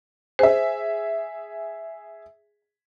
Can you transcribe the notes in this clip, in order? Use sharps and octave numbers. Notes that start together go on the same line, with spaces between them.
G#4 C5 E5